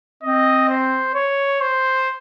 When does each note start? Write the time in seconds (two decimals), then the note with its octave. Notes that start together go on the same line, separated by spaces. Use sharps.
0.23 C4 D#5
0.69 C5
1.15 C#5
1.61 C5